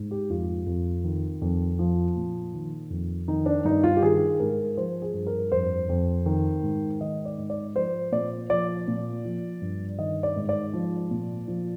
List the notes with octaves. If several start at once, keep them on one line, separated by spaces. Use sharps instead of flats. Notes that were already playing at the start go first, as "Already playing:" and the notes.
Already playing: G#2
G4
F2 F4
F2
D#3
F2
F3
A#2
D#3
F2
D#3 D#4
D4
G2 D#4
F4
G4
D#3 G#4
G#2 A#4
F3 C5
G#4
G2
A#4
F2 C5
F2
D#3
G#2
D#3 D#5
D5
G#2
D5
F3 C5
A#2 D5
F3 D5
A#2
F3
G2
D#3 D#5
D5
G#2
D5
F3
A#2
F3